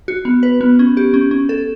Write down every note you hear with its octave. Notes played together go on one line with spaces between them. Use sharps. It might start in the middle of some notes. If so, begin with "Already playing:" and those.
F#4
B3
B4
B3
C#4
G4
C#4
C#4
A4